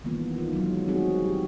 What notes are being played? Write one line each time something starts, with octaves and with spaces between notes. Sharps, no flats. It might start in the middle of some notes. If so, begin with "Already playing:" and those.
D#3 E3 G3 A#3 B3 F4
D#4 F4
F#3 G#3
G3 C4 D#4 F#4 G#4
G3 G4